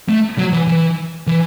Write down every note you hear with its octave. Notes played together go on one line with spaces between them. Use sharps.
A3
F#3
E3
E3
E3